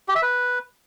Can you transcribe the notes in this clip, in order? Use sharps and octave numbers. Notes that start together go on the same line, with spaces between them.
G4
E5
B4